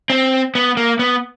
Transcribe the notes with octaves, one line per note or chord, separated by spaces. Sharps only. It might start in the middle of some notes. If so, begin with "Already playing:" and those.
C4
B3
A#3
B3